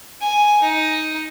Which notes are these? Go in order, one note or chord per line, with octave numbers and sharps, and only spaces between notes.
G#5
D#4